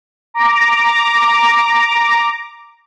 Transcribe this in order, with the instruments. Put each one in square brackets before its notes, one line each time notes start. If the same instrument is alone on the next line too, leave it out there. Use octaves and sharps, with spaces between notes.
[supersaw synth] A#5 D6